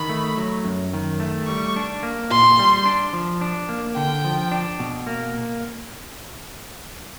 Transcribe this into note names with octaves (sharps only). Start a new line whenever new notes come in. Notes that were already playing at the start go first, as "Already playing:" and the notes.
Already playing: D#3 B5
A3
F#3
F#2
D#3
A3
G3 C#6
D4
A#3
A#2 C6
G3
D4
F3
D4
A#3
D3 G5
F3
D4
B2
A#3